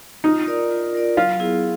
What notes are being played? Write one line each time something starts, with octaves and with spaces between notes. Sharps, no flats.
D#4 F4
A#4 D5
F4
A#4 D5
F#3 F4
B3 E4 G#4